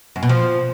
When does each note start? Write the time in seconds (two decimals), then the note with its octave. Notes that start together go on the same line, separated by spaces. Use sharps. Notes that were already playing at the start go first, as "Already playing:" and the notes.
0.16 F#2
0.23 B2
0.29 F3